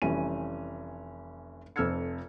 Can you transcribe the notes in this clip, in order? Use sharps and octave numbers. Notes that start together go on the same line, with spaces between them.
F1 E3 G3 C#4 D#7
F1 F2 E6 F6 G#6 C#7